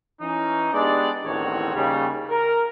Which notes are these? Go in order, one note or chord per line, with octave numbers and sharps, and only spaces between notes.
E3 C#4 D#4
G#3 B3 D4 G4 D5
A1 E2 D#3 C4 F#4 C#5
D#2 C#3 G3
A#4